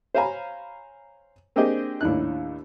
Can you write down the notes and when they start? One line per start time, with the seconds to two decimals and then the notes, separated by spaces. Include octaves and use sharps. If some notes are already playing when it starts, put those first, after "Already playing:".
0.15 C5 C#5 F5 G#5 A#5 B5
1.56 A#3 C4 D4 G4 G#4 D#5
2.01 D#2 A2 D4 D#4 F#6